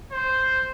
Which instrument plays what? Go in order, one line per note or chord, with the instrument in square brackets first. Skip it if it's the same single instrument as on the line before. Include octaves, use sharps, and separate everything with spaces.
[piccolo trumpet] C5